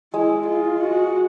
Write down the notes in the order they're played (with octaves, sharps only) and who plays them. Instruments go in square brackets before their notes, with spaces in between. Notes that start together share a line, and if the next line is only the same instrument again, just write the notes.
[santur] G#3 [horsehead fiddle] E4
[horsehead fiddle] F4
F#4